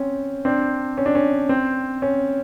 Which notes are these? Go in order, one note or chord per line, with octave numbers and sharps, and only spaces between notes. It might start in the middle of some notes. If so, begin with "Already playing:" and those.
Already playing: C4 C#4
C4 D4
C#4
D4
C#4
C4
C#4